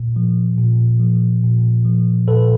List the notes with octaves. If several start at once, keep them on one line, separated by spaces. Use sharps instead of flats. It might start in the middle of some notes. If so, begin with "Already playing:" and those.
Already playing: A#2
F3
A#2
F3
A#2
F3
A#2 A4 B4